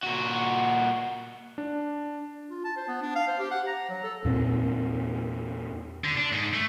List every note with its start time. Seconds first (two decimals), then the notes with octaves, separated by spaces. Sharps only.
0.03 A#2 F#4
1.58 D4
2.50 F4
2.64 A5
2.77 C5
2.88 B3
3.02 D4
3.15 F5
3.27 C5
3.39 G4
3.51 F#5
3.67 A#5
3.89 F#3
4.03 A4
4.25 E2 A#2 C4
6.04 D3
6.17 D4
6.32 G#2
6.53 A3